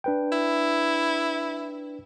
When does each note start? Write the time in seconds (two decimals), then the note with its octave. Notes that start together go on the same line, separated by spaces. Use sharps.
0.04 D4 B4 G5
0.32 E4